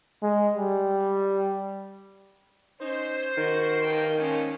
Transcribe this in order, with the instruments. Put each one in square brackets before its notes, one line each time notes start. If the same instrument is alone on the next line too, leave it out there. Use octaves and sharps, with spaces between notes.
[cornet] G#3
G3
[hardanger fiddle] C#4 [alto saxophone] D#4 [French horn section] C5
[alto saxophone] D#3 [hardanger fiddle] F#4
[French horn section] G2 A#3 [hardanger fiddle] G5
[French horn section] A#2 F3 G#3 [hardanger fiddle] C#4